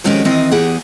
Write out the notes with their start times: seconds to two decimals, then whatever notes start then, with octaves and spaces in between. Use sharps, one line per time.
0.04 F2 D#3 G#3 C#4 F#4 G4
0.25 D#3 E3 C4 D#5
0.51 E2 G4 G#4 F#5